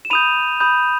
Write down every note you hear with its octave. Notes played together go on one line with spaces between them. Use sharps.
E7
B5 D#6 G6 D#7 F7
B5 D#6 G6